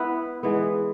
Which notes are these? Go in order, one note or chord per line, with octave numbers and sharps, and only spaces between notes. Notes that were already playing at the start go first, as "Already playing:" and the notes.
Already playing: B3 E4 B4
E3 G#3 B3